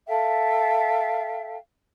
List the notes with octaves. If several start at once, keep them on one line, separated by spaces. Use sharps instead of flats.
A4 E5 F5 G5